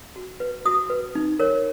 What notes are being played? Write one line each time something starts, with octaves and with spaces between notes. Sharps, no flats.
F#4
B4
F#4 D#6
B4
D#4
A#4 C#5